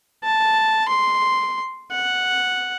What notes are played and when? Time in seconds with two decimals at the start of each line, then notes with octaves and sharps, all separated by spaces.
0.24 A5
0.88 C6
1.92 F#5